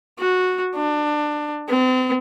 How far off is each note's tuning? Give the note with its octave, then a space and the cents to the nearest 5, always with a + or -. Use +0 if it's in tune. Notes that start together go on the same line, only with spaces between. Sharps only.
F#4 -10
D4 +20
C4 -40